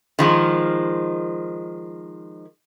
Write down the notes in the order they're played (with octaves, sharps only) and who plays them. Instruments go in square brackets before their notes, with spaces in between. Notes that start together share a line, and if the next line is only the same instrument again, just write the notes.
[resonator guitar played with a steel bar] D#3 F3 G#3